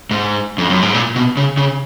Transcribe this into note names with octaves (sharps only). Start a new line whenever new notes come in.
G#2
F2
F#2
G#2
A#2
B2
C#3
C#3